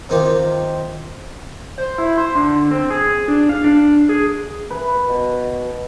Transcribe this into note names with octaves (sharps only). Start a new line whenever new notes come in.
C3 D#3 C4 F4 G4
C5
E4
C5
D3
C4
G#4
D4
F5
D4
G#4
B4
B2